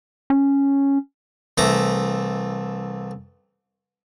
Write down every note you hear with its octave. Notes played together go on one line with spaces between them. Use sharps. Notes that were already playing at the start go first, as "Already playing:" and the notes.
C#4
C2 E3 A3 A#5 D6